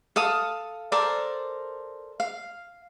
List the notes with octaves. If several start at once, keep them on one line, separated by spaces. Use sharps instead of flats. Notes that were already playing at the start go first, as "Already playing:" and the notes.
A4 F5 D#6
A4 A#4 C5 D5
F5